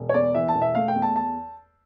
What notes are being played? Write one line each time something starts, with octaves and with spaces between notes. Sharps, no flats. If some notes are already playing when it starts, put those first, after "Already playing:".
Already playing: E1
C#5
E2 D5
E3 E5
A5
E1
E5
A3 F5
G5
E2
A5
A5